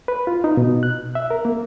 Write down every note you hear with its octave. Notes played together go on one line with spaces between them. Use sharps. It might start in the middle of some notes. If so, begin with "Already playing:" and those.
B4
F4
D#4
B2
F#6
E5
A#4
A#3